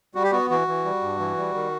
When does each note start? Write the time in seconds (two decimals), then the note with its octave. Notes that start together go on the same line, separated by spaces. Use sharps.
0.15 G3 F#4
0.23 G4
0.31 B3 F#4
0.50 E3 F#4
0.68 E3
0.85 G3
1.02 G2
1.20 E3
1.37 G3
1.54 D#3